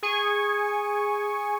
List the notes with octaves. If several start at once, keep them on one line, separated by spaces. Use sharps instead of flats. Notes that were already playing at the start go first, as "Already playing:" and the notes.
G#4 G#5 C#6